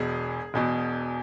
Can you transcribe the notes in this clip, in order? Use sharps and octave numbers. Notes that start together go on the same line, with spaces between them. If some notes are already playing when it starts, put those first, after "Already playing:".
Already playing: E1 E2 B2 G#4
E1 E2 B2